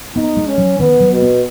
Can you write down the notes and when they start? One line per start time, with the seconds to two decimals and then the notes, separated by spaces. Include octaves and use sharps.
0.16 B3 D#4
0.37 G#3
0.47 C#4
0.58 F#3
0.79 D#3 B3
1.00 F#3
1.12 B2
1.22 B3